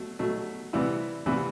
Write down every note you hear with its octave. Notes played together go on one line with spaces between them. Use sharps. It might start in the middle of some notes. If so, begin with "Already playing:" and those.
Already playing: B2 F#3 A3
B2 F#3 A3
C3 E3 G3 B3 E4
C3 E3 G3 B3 E4